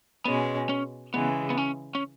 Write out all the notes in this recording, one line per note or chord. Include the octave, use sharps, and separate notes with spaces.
B2 G#3 B3 C#4
C#4
C#3 E3 G#3 B3
B3
C#4
C#4